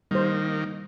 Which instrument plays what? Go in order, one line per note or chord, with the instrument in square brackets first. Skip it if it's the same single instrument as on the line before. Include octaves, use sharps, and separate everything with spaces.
[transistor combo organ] D#3 A#3 [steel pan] G3 C5